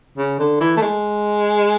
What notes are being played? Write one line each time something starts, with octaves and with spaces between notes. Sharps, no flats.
C#3
D3
E3
A3
G#3